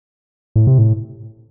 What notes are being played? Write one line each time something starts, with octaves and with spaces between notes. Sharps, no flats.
A2
C3
A2